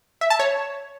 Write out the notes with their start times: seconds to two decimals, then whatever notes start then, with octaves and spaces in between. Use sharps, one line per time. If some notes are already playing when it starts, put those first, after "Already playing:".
0.21 E5
0.30 A5
0.39 C#5